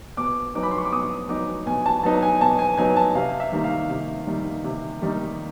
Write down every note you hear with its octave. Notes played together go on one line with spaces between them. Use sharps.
B2 D6
F#3 B3 D#4 D6
B5
C6
C#6
D6
B2 D#6
F#3 B3 D#4 D6
B2 G#5
A5
F#3 B3 D#4 A5
G#5
B2 A5
G#5
F#3 B3 D#4 G#5
A5
C3 F5
E5
D#3 G3 A#3 D#4
F5
C3
D#3 G3 A#3 D#4
C3
D#3 G3 A#3 D#4